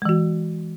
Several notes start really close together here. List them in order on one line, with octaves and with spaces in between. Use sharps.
G#3 E3 F#4